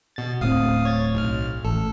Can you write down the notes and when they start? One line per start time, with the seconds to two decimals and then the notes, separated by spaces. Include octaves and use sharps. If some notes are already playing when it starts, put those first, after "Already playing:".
0.16 B2 A6
0.41 D1 A2 C4 F5 D#6
0.85 C#5 G#6 A6
1.14 B1 F6
1.65 A1 A4